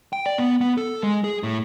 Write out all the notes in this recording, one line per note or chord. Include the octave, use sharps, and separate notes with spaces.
G5
D5
B3
B3
A4
G#3
G#4
A2